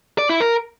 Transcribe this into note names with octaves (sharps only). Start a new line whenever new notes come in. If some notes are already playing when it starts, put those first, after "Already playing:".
D5
E4
A#4